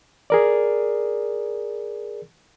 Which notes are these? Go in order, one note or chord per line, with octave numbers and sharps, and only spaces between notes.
G#4 A#4 D5